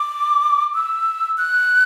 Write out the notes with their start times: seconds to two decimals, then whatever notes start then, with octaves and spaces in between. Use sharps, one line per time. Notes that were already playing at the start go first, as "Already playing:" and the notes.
Already playing: D6
0.74 E6
1.38 F#6